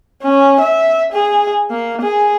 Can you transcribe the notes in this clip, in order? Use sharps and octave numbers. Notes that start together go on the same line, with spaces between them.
C#4
E5
G#4
A#3
G#4